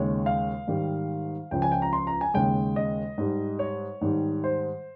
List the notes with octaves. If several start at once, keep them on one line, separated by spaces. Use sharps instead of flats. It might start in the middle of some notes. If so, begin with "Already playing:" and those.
Already playing: D#2 C#3 G#3 C#5
F5
G#2 D#3 G3
C#2 C#3 F3 G5
G#5
G5
A#5
C6
A#5
G#5
D#2 C#3 G#3 G5
D#5
G#2 G3
C#5
G#2 D#3 G3
C5